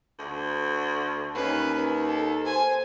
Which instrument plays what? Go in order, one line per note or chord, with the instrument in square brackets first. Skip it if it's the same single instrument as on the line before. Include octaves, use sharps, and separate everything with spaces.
[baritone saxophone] D2
[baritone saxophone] D#2 [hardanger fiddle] C#4 B4
[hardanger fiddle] A4
C5 G#5